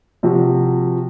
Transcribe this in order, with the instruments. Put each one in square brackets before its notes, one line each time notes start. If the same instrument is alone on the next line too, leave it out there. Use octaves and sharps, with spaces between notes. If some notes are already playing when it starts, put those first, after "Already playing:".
[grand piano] C3 F3 F#4